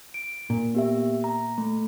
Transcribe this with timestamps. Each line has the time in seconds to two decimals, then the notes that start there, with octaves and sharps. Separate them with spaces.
0.14 D7
0.50 A#2
0.74 B3 G4 E5
1.24 A#5
1.58 A3